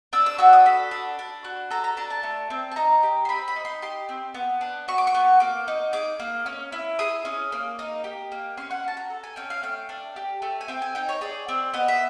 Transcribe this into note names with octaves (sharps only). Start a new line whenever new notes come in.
D4 E6
E6
F#4 E6
D#6
A4 B5
D4
D4
F#4
A4 A#5
A#5
D4 A5
A5
A3
C4
A5
D#4 A#5
G4
C6
C4 B5
B5
D#4
C6
G4 C6
C4
B3
D4
F#4 C#6
D6
C#6
B3
A#3 D6
D#4
G#4 D6
A#3
C#4
E4
G#4 D#6
C#4
A#3
D#4
G4
A#3
C#4 C6
F#5
F#4 A5
A#5
A4
G#5
C#4 G5
F5
A3 G5
D4
G4
A3
G#5
C4 G5
G#5
D#4 G5
C#5
G#4 D5
C4
B3 D#5
E5